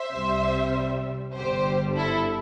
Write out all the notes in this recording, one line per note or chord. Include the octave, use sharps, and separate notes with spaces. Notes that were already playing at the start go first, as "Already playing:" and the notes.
Already playing: C5 E5
C2 C3 G3
G1 G2 D3 G3 G4 C5
E4 A4